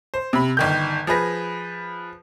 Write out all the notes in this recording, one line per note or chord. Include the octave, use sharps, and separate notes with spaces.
C5
C3 B5
G1 D#3 G6
F3 G#4 B4 A#6